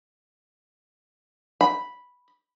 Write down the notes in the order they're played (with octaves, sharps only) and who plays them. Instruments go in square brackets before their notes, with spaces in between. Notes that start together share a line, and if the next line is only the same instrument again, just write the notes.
[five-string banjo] B5